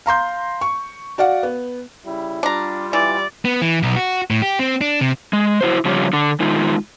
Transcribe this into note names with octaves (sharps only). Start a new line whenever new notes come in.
F5 A#5 C6 G6
C#6
F#4 D5 F5 F#5
B3
C#3 G3 E4
G3 D4 F4 A#5
E3 D5
B3
E3
B1
F#4
A2
G4
C4
D4
C3
G#3
E4 F#4 C5
C#3 F3 G3 C#4
D3 D4
D#3 G#3 D#4 F4